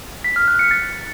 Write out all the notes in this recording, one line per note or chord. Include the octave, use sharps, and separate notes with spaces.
B6
F6
F#6
C#7
A6